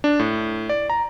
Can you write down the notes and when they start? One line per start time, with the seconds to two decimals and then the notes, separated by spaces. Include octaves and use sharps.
0.04 D4
0.19 A2
0.69 D5
0.90 A#5